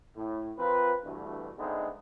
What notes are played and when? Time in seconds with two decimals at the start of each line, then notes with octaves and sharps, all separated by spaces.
0.17 A2
0.58 F3 C4 F4 A#4 B4
1.05 D2 G2 B2 E3 A3
1.59 D3 G#3 A3 B3 C4 D#4